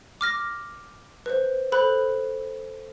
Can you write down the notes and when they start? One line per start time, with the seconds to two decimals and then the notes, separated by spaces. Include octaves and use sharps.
0.21 D6 F6 A#6
1.26 B4 C5
1.72 A4 C5 B5 F#6